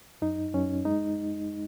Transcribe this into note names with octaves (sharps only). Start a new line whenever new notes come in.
F#2 D#4
F#2 C#4
G#3 D#4